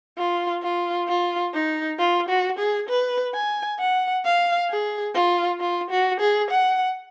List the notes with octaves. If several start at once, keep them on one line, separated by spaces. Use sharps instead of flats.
F4
F4
F4
D#4
F4
F#4
G#4
B4
G#5
F#5
F5
G#4
F4
F4
F#4
G#4
F#5